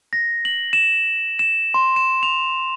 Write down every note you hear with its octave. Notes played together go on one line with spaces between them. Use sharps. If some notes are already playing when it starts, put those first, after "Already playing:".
A#6
F#7
E7
E7
C6
E7
F7